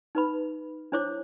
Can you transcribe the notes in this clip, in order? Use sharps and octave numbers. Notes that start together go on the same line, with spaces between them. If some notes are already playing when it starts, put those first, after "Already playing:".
D#4 B4 B5
D4 E4 C5 C#5 D6